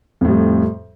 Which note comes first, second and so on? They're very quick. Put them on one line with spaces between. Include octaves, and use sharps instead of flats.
F2 A2 G3